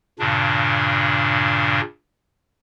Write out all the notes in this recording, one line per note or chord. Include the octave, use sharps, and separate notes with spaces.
G2 A#2 C#3 D4